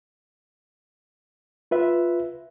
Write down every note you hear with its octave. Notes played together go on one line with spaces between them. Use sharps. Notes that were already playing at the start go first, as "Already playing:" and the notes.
F4 B4 E5